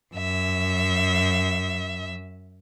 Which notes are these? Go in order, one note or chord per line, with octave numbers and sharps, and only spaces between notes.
F#2 E5